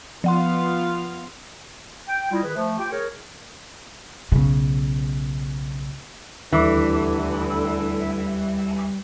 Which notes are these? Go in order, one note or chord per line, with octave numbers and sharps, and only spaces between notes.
F3 B3 F4 F5 F#5 C6
G5
G3 E4 F4 D#5
D#3 G#4 B4
F3 A3
F4 G4 G5
G#4 A#4 C#5
B1 C#3
D#2 A2 D3 E3 G3 D6